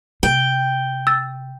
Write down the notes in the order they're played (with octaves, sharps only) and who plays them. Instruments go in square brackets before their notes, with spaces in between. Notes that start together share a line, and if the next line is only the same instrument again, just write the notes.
[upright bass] C3 [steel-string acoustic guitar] G5
[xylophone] E6 A6